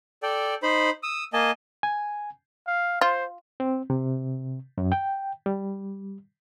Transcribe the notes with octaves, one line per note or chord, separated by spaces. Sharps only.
A4 D5 G5
D#4 C5 B5
D#6 E6
A#3 D#5 G#5 A5
G#5
F5
F4 C5
C4
C3
F#2
G5
G3